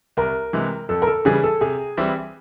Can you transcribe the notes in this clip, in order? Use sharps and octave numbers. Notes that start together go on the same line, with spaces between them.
C2 A#4
C3 E3 G#3
F2 A4
A#4
A4
C#3 E3 G3 G#4
A4
C3 G#4
E3 G3 C4 E4